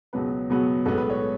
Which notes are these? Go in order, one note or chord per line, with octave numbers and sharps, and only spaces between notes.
C#2 B2 F#3 B3 B4
C#2 B2 F#3 B3
B1 A2 G#3 B3 A4
B4
C#5